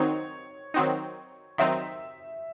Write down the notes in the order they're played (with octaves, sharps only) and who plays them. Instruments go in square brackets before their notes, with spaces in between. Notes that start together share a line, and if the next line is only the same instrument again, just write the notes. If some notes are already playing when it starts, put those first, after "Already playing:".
Already playing: [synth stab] D#3 F#3 C4 D#4 [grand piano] C#5
[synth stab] D#3 F#3 C4 D#4
[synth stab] D#3 F#3 C4 D#4 [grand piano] E5